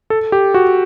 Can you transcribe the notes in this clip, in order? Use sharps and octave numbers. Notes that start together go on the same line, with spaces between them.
A4
G4
F#4